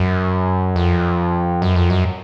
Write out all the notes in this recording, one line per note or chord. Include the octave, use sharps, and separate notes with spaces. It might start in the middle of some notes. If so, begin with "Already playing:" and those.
Already playing: F#2
F2
F#2
F2
F#2